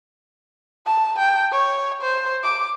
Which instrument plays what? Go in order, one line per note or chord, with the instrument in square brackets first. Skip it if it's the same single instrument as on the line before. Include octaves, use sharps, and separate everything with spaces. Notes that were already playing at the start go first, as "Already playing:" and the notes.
[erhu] A5
G5
C#5
C5
D6